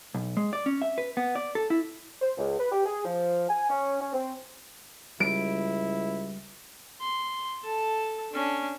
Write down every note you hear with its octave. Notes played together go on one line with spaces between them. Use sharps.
B1
G#3
D5
C#4
E5
B4
B3
D5
A4
E4
C5
C#2
B4
G4
G#4
F3
G#5
C#4
C#4
C4
C#2 G3 E4 D7
C6
A4 A5
C#4 D4